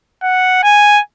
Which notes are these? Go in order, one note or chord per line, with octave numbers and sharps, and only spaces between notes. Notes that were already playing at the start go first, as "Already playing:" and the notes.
F#5
G#5